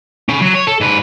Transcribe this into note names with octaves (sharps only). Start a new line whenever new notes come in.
C#4 B5
F#3
C#5
A4
G#2 B4